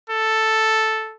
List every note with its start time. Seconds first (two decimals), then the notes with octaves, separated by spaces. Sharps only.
0.10 A4